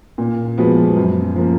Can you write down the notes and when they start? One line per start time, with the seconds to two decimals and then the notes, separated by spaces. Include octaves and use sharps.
0.18 A#2
0.58 F3 G#3 B3 F#4
0.96 F#2
1.36 F3 A#3